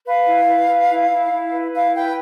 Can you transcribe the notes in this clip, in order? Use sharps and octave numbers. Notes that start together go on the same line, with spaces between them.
B4 F5
E4
B4
B4
E4
E4
E4
B4
E4 F5
B4 G5